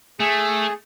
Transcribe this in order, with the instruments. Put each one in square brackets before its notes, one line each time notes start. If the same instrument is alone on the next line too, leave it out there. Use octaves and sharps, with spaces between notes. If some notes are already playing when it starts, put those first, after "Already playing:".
[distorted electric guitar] A3 [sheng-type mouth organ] G#4